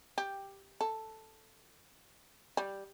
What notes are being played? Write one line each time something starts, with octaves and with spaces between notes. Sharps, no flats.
G4
A4
G3